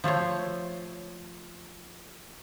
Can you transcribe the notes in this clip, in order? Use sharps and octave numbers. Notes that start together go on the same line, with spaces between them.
F3 A3 C5 C#5